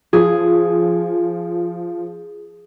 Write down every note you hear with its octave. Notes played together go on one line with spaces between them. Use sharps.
F3 G#4